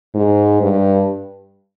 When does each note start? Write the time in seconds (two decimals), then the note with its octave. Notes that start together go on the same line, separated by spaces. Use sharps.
0.14 G#2
0.61 G2